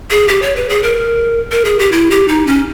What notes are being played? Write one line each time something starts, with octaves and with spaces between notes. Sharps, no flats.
G#4
G4
C#5
B4
G#4
A#4
A#4
G#4
G4
E4
G4
D#4
C#4